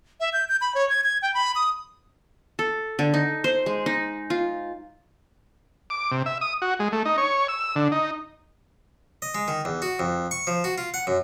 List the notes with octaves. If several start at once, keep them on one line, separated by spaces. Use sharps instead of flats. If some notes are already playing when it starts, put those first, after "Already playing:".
E5
G6
G6
B5
C#5
G#6
G#6
G5
B5
D#6
A4
D3
D#4
C5
G#3
D#4
F4
D6
C3
E5
D#6
F#4
G#3
A3
D#4
C#5
E6
D3
D#4
D#5
G#3
D#3
E2
F#4
F2
C#6
F3
F#4
F4
F#5
F#2